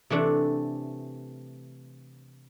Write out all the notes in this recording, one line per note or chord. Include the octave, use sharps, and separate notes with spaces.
C3 E3 A3 D4